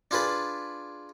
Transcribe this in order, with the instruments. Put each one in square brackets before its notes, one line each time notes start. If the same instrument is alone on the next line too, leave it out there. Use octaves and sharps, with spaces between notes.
[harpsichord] D4 F4 G#4 B4 B5